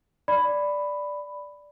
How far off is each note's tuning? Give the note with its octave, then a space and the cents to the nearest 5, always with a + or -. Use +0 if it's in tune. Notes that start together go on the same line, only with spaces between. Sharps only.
D5 +0 B5 +5